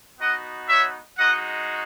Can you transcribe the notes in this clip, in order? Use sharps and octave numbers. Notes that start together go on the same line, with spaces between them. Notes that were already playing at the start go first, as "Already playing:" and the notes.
B3 D#4 F#4 D#5 F#5
C#5 E5
G#3 D#4 F#4 D#5 F#5